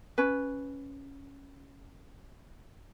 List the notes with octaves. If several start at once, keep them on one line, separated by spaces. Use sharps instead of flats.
C#4 B4